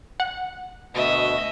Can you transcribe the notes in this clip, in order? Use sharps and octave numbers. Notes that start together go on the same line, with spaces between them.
F#5
D2 B2 D#5 E5